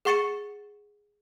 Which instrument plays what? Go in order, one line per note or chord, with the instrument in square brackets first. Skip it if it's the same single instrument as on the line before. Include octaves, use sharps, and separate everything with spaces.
[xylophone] G#4 F#5 C#6 A6 C#7 E7